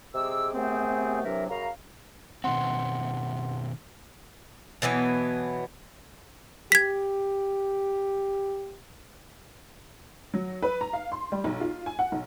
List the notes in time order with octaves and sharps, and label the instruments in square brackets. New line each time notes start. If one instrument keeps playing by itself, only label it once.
[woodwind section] C3 G#3 G#4 D6 E6
D#2 C3 A3 B3 C4 G#4
C3 E3 F#3 D4 A#4 E5
F#2 C#3 F5 A#5
[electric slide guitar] B2 D#3 C4 [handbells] F#5 C6
[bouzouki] B2 E3 F#3 B3
[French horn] G4 [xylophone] G#6 B6
[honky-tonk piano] F#3
B4
A#5
F5
C6
G3
B1
F4
G#5
F#5
B1